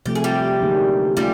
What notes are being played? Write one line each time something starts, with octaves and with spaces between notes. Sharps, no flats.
C3 F3 A3 G4
G#4
G3 G4
D3 F#3 A#3 D#4 G#4
G3 A3 C#4 F4 G4 G#4